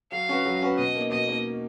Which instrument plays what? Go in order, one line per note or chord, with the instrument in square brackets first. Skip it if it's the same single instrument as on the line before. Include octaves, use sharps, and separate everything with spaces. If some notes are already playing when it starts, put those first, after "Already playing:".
[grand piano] F#3 [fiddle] F5
[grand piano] C#4 F#4 B4
F#3
C#4 F#4 B4
[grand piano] B2 [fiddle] D#5
[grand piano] A#3 D#4
[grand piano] B2 [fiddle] D#5
[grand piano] A#3 D#4